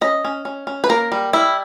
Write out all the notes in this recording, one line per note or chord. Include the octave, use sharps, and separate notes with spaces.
C#4 D#5
C#4
C#4
C#4
B4
A#3 A#4
G3
G3 E4